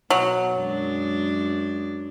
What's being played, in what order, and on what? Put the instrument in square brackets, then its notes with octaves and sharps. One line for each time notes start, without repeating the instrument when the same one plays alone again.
[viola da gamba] B2 [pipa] F#3
[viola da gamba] F#2 G#3 D4